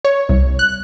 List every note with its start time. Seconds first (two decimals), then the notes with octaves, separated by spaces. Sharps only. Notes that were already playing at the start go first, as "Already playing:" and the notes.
0.05 C#5
0.29 C2
0.59 F#6